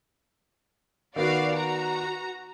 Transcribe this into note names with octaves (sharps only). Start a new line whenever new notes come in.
D#3 B3 F#4 D5 F5
F#4 A#5